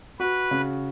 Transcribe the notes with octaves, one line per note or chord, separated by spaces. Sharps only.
F#4 B4
C#3